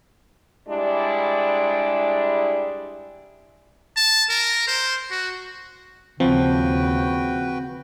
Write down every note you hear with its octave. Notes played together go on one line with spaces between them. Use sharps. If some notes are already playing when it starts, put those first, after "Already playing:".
G3 G#3 D4 E4
A5
A#4
C5
F#4
D#2 C#3 F3 C4 F#4 B4 G5